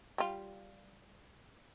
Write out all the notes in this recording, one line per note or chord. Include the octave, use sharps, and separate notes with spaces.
G3 F4